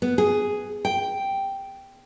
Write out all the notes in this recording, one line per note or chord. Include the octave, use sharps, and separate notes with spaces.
B3
G#4
G5